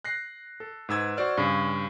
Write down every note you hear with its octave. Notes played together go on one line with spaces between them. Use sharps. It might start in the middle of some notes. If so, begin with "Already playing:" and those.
F#6 A#6 C7
A4
G#2 B4 E6 G#6
F#4 C5 D5 F6
G2 C#3